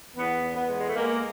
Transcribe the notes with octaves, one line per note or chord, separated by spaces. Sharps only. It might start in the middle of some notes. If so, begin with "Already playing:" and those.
E2 B3
E2
B3
G#3
G#3
A3
G#3 A#3